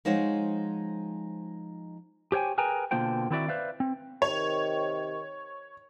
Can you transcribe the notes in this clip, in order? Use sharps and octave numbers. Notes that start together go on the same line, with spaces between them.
F3 G#3 D#4 C5 C#5 F#5
G4 C5 C#5 G5 G#5
G#4 A#4 B4 G5 G#5 A#5
B2 D3 A#3 F4 C5 G5
D#3 C4 E4 F#4 D5 E5
B4 C5 D5 E5 F5
C4
C3 D#3 C#5